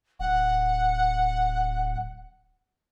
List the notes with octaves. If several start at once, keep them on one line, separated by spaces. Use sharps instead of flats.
D1 F#5